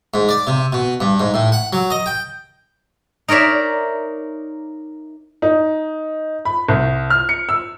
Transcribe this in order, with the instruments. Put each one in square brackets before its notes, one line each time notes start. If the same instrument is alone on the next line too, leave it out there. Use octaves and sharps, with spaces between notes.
[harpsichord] G#2
D5
C3
B2
G2
G#2
A2
F#5
F#3
D#5
G5
[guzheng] D#4 A#4 C#5 D5 E5
[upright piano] D#4
B5
C2
F6
C#7
E6